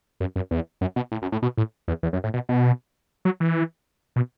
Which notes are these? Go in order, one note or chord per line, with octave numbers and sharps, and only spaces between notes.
F#2
F#2
E2
F#2
B2
A2
F#2
A2
B2
A2
E2
E2
F#2
A2
B2
B2
F#3
E3
B2